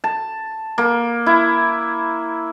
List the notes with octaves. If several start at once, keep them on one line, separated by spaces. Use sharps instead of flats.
A5
A#3
E4